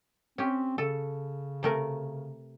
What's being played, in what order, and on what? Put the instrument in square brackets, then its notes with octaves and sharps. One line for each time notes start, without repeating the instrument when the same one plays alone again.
[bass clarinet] C4 [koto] C#4 G4
[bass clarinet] C#3 [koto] A4
[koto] C3 A3 A#4